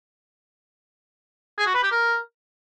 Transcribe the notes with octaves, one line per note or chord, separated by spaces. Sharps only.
G#4
F#4
B4
G4
A#4